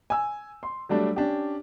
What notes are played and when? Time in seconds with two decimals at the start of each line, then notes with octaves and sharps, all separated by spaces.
0.10 G#5 E6
0.63 C6
0.89 F#3 G3 A3 D4
1.16 C#4 D4 G4